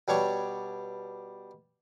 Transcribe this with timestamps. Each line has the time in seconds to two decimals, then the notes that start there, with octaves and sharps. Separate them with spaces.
0.08 B2 G3 D4 C#5 C#6